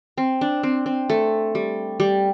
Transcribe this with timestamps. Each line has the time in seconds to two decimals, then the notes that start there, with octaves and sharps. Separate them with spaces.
0.18 C4
0.41 D4
0.63 C4
0.86 C4
1.10 A3
1.55 G3
2.00 G3